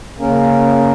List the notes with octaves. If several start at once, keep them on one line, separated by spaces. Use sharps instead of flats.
C#3 A#3 C#4 A#4